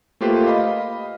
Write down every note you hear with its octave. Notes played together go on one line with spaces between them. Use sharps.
A3 A#3 F4 G4 B4 C5
D#5 F5 B5